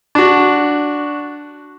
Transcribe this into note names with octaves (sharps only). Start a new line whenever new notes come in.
D4 F#4